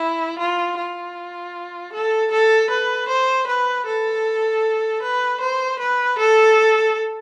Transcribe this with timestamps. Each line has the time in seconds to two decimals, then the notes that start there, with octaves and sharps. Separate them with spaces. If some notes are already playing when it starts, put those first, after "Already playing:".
Already playing: E4
0.39 F4
0.78 F4
1.93 A4
2.31 A4
2.70 B4
3.08 C5
3.47 B4
3.86 A4
5.02 B4
5.41 C5
5.79 B4
6.18 A4